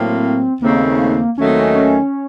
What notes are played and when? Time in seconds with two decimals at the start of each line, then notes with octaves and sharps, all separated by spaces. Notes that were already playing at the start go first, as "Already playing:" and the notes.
Already playing: A2 F#3 A#3 C4
0.61 D#2 C#3 A3 A#3 C4 D#4
1.37 D#2 D#3 F#3 A3 C#4 D#4
1.49 C4
1.61 C#4
1.75 C#4